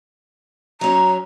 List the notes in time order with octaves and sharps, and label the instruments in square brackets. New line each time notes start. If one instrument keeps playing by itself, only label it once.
[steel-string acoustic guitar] F#3 C#4 [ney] A#5